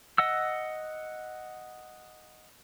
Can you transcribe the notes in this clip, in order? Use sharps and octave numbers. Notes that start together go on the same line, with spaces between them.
D#5 F#5 E6